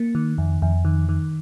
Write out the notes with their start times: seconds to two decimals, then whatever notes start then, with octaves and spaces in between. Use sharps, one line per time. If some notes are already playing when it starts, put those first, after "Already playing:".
Already playing: A#3
0.15 D#3
0.38 F2
0.62 F2
0.85 D#3
1.09 D#3